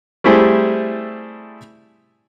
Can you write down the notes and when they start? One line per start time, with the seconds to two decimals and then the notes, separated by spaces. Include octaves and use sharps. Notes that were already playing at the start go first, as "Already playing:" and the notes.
0.24 G3 A3 C4 E4 G4 G#4